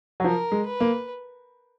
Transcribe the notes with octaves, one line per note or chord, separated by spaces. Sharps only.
F#3
F3 A#4
G#3
B4
A#3